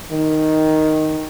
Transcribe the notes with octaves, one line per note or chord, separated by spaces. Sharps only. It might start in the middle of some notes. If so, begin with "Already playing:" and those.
D#3